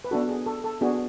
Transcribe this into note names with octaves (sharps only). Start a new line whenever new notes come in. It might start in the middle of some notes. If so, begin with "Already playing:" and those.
B4
B3 D4 F#4 A4
G#4
A4
A4
B3 D4 F#4 G#4